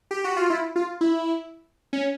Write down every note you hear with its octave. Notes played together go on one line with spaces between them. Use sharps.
G4
F#4
F4
E4
F4
E4
C#4